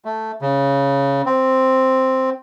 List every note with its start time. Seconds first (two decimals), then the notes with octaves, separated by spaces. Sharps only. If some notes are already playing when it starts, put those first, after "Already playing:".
0.05 A3
0.42 C#3
1.26 C4